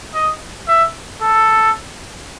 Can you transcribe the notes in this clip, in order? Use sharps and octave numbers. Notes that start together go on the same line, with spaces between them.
D#5
E5
A4